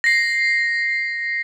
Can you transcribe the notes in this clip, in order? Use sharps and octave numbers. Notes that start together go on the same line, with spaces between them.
A#6 C7